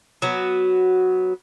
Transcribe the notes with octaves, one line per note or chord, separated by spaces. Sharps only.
F#3 B3 F#4